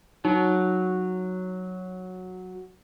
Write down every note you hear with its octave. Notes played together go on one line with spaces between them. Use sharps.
F#3 D#4